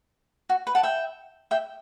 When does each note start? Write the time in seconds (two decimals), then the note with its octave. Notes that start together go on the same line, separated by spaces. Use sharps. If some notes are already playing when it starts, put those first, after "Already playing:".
0.49 F#4
0.67 B4
0.75 F#5 A5
0.83 E5 G5
1.51 E5 G5